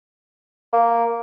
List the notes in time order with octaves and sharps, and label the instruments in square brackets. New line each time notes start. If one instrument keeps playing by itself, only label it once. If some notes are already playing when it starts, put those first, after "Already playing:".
[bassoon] A#3